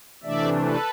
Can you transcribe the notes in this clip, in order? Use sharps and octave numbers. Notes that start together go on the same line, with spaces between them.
C3 E3 A3 D4 D5 E5
A4 B4